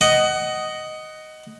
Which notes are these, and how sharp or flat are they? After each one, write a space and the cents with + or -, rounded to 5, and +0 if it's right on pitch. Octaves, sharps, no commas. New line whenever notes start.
D#5 +0 F#5 +20